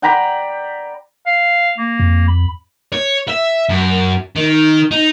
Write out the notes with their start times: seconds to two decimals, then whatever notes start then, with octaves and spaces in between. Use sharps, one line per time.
0.02 D5 G5 A#5 B5
1.26 F5
1.78 A#3
2.00 F2
2.28 B5
2.93 C#5
3.28 E5
3.69 F#2
4.35 D#3
4.91 D#4